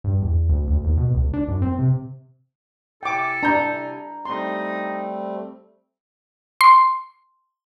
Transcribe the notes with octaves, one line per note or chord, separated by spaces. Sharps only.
G2
E2
D2
D2
D#2
B2
C#2
D4
F#2
C4
C3
C3 E4 A4 G5 G#5 D6
D4 A#5 B5 G6
G3 A3 C4 D#4 C6
C6